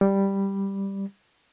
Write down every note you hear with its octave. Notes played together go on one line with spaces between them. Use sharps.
G3